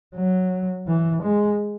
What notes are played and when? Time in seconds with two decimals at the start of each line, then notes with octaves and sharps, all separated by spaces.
0.15 F#3
0.88 E3
1.23 G#3